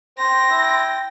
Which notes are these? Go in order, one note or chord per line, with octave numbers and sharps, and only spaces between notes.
C5 G5 C6 A#6
E4